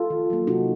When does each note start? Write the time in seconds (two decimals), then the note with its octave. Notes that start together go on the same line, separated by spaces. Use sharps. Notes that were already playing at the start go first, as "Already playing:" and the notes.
Already playing: F4 A4
0.10 D#3
0.30 F#3 A#3
0.47 C3 D#4 F#4